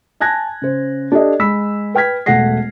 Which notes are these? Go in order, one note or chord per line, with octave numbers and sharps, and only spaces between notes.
G#5 A5 F#6 G#6 A#6
C#3 C5
D4 G4 A4 D#5
G#3 B5 E6 B6
B4 G5 F6 G#6 B6
E1 A3 F#5 A#6 C7